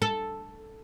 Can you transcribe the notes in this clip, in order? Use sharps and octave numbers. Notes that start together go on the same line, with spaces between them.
A4